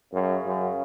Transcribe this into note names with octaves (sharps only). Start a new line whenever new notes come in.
F#2 C#3
F#2